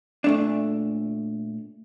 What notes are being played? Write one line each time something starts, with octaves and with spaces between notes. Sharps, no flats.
A#2 A3 D4